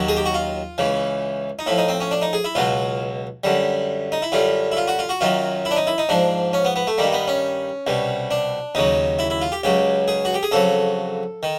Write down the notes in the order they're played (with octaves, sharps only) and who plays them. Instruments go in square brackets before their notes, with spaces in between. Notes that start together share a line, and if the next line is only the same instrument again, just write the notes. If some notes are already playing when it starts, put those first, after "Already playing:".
Already playing: [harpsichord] D#2 D#3 F#3
G#4
G4
F#4
F4
C#2 C#3 E3
D#4
A2 F3 E4
D#4
C4
C#4
D4
D#4
G#4
E4
C#2 B2 F#3 F4
F#2 D3 G3
D#4
E4
F#2 D3 G3 F4
E4
F4
F#4
F4
F#4
F#2 D#3 F#3 F4
E4
D4
D#4
E4
D#4
G#2 F3 D4
C#4
B3
B3
A3
G2 D#3 G3 A#3
B3
C#4
C2 B2 G3
D4
D#2 C#3 F#3 D#4
E4
E4
F4
G4
C#2 C#3 F#3 G4
G#4
F#4
G4
G#4
F2 C#3 F#3 A4
D#3